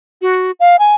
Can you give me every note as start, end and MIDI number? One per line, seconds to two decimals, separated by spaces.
0.22 0.52 66
0.60 0.76 77
0.79 0.95 80